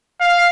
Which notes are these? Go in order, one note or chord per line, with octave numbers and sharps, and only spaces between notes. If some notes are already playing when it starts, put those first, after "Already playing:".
F5